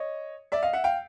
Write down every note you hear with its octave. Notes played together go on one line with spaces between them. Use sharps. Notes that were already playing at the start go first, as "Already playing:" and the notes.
Already playing: C#5 D#5
D5 E5
D#5 F5
E5 F#5
F5 G5